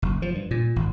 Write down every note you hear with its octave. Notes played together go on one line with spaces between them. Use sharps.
F#1
F3
G2
A#2
G#1